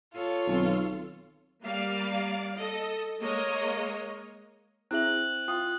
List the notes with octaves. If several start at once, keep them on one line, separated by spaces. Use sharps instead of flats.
F4 A4 C#5
B1 D#3 F#3 C4
G3 A#3 D5 F5
A4 D#5
G#3 A#3 A#4 C#5 D#5
C4 E4 G#4 E5 F#6 F#7
F4 G5 D#6